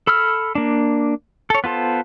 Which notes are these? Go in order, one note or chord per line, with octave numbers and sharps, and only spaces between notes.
A4 B5 E6 F6
A#3 D4
A4 C#5
B3 F4 A4 C5